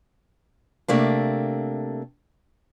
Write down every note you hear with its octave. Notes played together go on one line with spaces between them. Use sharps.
C3 A3 A#3 D4